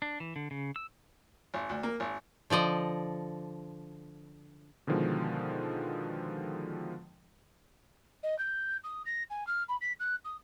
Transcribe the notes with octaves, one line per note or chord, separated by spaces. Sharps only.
D4
E3
D3
C#3
E6
G#1
D2
A#3
G#1
D3 F3 D5 D#5
B2 D3 D#3 F3 G#3
D#5
G6
D#6
A#6
G#5
F6
B5
B6
F#6
D#6